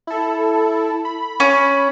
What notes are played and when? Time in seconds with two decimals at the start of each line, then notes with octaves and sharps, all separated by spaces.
0.07 E4 A4
1.05 B5
1.40 C#4